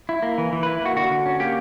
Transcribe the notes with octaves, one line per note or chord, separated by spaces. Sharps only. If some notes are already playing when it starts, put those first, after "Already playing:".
E4
A#3
E3
E3
E4 B4
A#3 F#4
D3 F#4
D3
C#4
A#3 G4